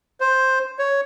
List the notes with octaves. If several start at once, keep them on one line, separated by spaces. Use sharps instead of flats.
C5
C#5